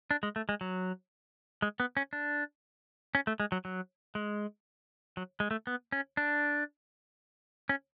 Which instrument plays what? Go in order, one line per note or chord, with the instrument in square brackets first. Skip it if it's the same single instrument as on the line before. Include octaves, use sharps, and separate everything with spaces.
[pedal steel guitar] D4
G#3
A3
G#3
F#3
G#3
B3
C#4
D4
C#4
A3
G#3
F#3
F#3
G#3
F#3
G#3
A3
B3
C#4
D4
C#4